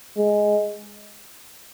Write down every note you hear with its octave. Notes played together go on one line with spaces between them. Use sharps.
G#3